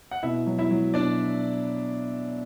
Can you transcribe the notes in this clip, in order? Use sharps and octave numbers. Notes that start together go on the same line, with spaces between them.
F#5
B2 E4 E5
F#3
E4 E5
F#3
B2 D4 D5